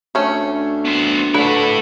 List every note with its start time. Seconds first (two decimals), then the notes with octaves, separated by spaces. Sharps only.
0.15 D2 A3 C#4
0.85 B3 C5
1.34 D3 A3 E4 B4